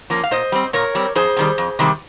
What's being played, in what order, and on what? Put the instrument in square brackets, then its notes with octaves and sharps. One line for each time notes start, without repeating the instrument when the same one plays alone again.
[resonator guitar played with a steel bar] F3 A#3 C#4
F5
A#2 C5 D#5
G3 C4
A#2 A#4 C#5
G3 C4
F2 G#4 C5
C3 D#3 G3
F2
C3 D#3 G3